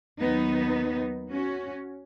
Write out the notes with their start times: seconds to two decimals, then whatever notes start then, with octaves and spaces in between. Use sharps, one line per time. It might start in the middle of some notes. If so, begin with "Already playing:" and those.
0.20 D#2 D#3 F#3 B3 D#4
1.31 C#4 F#4